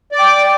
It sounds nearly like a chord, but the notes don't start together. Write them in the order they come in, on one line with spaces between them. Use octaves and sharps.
D5 D6 G5